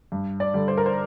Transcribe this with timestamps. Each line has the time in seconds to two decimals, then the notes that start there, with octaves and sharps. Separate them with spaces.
0.12 G2
0.40 D5
0.54 D3 G3
0.68 C5
0.77 A#4
0.86 C5